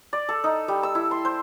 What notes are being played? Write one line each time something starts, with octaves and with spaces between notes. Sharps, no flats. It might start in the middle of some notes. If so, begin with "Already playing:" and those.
D5
A4
D#4
G3
E6
E4
C6
C5